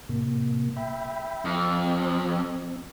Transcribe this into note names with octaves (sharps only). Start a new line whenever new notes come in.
A2 C3 A#3
E5 G5 B5
F2 C4